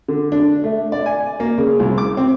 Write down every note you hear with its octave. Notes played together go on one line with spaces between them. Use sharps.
D3
D4
A3
D5
G#5
A#3
C#3
C2
D6
C4